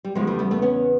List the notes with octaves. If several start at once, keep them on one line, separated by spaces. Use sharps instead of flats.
G3
E2 C#3 F3 G#3
G3 A3
A3 B3
A3 B3
B3 C#4